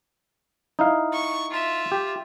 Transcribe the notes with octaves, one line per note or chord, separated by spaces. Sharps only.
D#4 E4 F5
C#6
F4 E5
G4